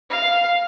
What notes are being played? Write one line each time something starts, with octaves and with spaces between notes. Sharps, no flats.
F5